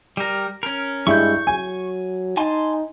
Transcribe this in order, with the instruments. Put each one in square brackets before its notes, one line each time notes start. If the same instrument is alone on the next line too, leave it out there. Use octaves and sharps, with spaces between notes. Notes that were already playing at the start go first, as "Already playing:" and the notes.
[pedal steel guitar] G3 A#4
C#4 A#4
[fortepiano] G2 E4 [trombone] G#3 [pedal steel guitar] C#6 G6
[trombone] F#3 [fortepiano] G#5
[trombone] D#4 [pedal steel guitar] G#5 A5 C6